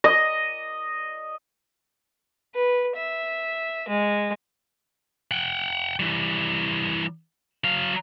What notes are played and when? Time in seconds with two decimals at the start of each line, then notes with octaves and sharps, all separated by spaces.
0.04 D#5
2.55 B4
2.96 E5
3.89 G#3
5.31 F#5 G5
5.99 E3 G3
7.64 F#3 F5